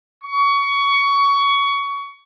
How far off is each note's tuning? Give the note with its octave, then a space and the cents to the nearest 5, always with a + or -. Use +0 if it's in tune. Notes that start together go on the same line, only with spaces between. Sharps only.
C#6 +20